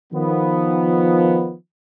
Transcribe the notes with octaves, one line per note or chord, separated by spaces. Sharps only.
D#3 F3 B3